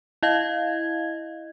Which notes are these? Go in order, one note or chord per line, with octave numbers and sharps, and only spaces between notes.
E4 D#5 F5 G#6